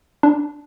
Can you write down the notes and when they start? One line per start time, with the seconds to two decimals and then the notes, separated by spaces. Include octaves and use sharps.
0.23 D4